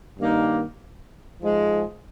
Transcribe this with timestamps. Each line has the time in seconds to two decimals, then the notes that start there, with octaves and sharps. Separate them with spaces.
0.19 G2 D#3 A#3 D#4
1.41 G#2 F3 G#3